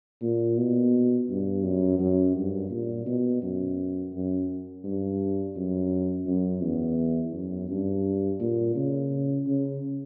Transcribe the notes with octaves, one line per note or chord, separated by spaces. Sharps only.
A#2
B2
G2
F#2
F#2
G2
A#2
B2
F#2
F#2
G2
F#2
F#2
E2
F#2
G2
A#2
C#3
C#3